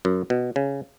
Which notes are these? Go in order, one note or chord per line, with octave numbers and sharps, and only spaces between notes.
F#2
B2
C#3